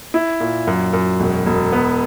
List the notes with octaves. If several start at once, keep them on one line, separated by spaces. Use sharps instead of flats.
E4
A#2
F#2
F#2
E1
E1
B3